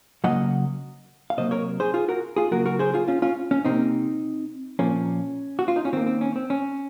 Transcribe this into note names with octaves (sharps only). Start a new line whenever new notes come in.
C#3 F#3 A#3 D#5 F#5
F5
C3 F#3 A#3 C5 D#5
A#4 C#5
G#4 C5
F4 G#4
F#4 A#4
F4 G#4
C#3 F#3 A#3 F#4 A#4
F#4 A#4
G#4 C5
F4 G#4
C#4 F4
C#4 F4
C#4
C3 F#3 A#3 C4 D#4
A#2 F3 A#3 C#4
F#4
F4
D#4
C#4
D#3 A#3 C4
C4
C#4
C4
C#4